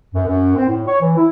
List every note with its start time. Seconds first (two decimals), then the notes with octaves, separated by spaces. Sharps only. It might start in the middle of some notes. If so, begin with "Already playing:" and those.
0.14 F#2
0.27 F#2
0.56 C4
0.68 A2
0.87 C#5
1.01 E3
1.17 E4